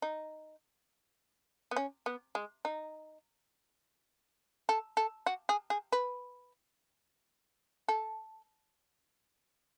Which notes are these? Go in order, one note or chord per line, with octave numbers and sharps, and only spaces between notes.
D#4
B3
C#4
B3
G#3
D#4
A4
A4
F#4
G#4
G#4
B4
A4